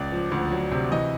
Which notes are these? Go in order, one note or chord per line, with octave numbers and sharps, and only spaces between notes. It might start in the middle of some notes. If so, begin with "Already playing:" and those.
Already playing: C#2 D5
F3
D2
F#3
C3
E3 D#5